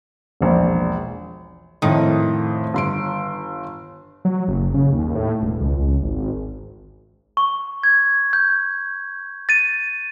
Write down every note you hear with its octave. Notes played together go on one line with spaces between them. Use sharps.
E1 A#1
F2 A2 D#3 D#6
G1 C6 D7
F#3
F#1
C#3
D#2
A2
E1
C#2
C#2
G#1
C#6
G#6
G6
A6 D#7